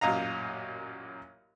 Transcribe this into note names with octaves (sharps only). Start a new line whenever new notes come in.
A1 F#2 A#2 D#5 F5 A#5